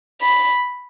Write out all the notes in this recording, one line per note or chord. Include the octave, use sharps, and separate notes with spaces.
B5